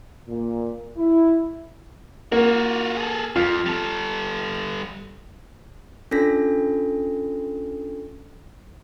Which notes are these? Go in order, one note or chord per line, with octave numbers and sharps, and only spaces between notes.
A#2
E4
A#3 F4 F#4
G#4 A4
F2 F4
G3 A4
C#4 D4 F4 A4 A#6 B6